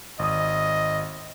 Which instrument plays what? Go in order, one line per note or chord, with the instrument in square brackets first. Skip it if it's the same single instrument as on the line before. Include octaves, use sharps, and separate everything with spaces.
[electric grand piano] G#1 D#6 [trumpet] D#5